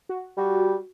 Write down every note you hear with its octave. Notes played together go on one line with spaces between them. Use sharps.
F#4
G3 F#4